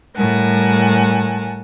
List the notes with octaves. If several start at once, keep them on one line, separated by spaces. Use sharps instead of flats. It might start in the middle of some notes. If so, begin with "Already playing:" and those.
A2 G3 A#4 F#5 G#5 A5